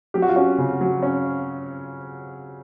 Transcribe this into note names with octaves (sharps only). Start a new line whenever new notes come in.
F#3 G4
F#4
F4
C#4 F#4
C#3
F#3
C#4